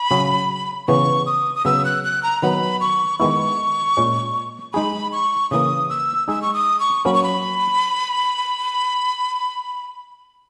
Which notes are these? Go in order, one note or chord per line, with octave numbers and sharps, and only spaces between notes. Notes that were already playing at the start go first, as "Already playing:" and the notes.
Already playing: B5
C#3 F#3 C#4 G#4
C#3 E3 B3 C#6
D#6
D#6
C#3 F#3 B3 E6
F#6
F#6
A#5
D#3 F#3 B3 B5
C#6
D#3 G#3 B3 E4 C#6
A#2 G#3 C#4
G#3 D#4 G#4 B5
C#6
C#3 E3 A#3 D#6
E6
G#3 D#4 G#4 E6
C#6
D#6
C#6
F#3 A#3 C#4 B5
C#6
B5